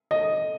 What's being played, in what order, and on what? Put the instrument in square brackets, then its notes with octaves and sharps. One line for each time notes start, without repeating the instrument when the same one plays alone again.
[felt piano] D#5